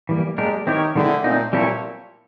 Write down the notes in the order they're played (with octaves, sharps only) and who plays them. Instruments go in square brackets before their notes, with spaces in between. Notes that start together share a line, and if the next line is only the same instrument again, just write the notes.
[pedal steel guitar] E3 G3 A#3
[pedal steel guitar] G3 A#3 D4 G4 A#4 [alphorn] G#3
[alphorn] D#3 [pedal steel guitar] C4 E4 G4 A#4 C#5
[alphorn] D3 [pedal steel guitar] D#3 G#3 C4 E4
[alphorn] A#2 [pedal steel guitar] A3 C4 D#4
[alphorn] A#2 [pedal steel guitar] G3 C4 E4 A4 C#5